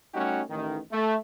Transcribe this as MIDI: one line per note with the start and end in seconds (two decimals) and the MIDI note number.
0.14 0.42 55
0.14 0.42 57
0.14 0.42 61
0.14 0.42 63
0.14 0.42 66
0.14 0.42 67
0.49 0.79 33
0.49 0.79 51
0.92 1.16 57